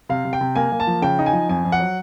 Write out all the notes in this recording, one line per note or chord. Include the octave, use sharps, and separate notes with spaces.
C3 F5
C3
G5
C3
A#3 G#5
A#3
A5
F3
C#3 G5
D#4
G#5
F3
F2 G#5
F2
F#5
F#3